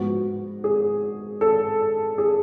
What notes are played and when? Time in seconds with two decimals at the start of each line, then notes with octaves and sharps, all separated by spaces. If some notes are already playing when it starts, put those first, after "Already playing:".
Already playing: G#2 F3 B3 F#4
0.64 G#4
1.41 A4
2.18 G#4